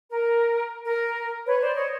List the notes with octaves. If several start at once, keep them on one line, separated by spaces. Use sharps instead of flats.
A#4
A#4
B4 C#5
C5 D5
C#5 D#5